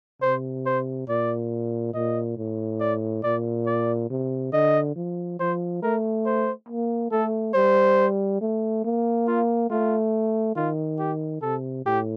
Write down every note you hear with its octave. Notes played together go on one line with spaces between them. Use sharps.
C3 C5
C5
A#2 D5
A#2 D#5
A2
D5
A#2 D5
D5
C3
D3 D#5
F3
F3 C5
A3 A#4
C5
A#3
A3 A4
G3 C5
A3
A#3
F4
A3 F4
D#3 F4
G4
C3 A4
A2 G4